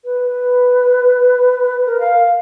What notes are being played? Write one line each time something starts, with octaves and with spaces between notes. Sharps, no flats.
B4
A#4
F5